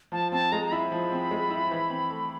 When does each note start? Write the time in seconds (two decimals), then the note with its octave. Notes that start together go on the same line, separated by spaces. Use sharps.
0.12 F3 A5
0.32 C4 A5
0.52 G#3 A#5
0.66 A#5
0.72 E4 B5
0.92 F3
1.12 C4
1.31 G#3
1.50 E4
1.71 E3
1.90 C4
2.10 A3